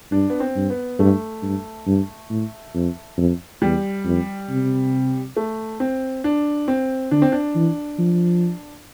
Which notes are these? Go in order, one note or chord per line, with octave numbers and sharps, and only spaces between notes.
G2 D4
B3
C4
G2
B3
G2 A3
G2
G2
A2
F2
F2
E2 G3
F2
C3
A3
C4
D4
C4
D3 D4
C4
D4
E3
F3